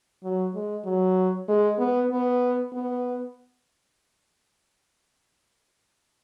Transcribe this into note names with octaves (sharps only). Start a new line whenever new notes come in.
F#3
G#3
F#3
G#3
B3
B3
B3